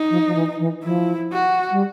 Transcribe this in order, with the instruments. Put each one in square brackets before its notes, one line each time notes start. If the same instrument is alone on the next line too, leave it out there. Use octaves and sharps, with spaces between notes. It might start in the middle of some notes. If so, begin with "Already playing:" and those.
Already playing: [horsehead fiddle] D#4
[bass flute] F3
F3
E3
E3
[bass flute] F3 [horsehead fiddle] E4
[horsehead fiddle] F#4
[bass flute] G3